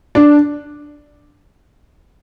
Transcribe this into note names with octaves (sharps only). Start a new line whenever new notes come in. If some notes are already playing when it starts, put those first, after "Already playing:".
D4